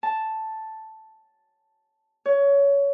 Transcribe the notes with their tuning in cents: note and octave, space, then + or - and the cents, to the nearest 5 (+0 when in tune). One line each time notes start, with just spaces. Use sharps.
A5 +0
C#5 +20